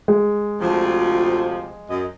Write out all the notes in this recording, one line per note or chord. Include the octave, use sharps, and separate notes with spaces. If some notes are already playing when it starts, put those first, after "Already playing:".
G#3
D2 C3 F3
F#2 D#5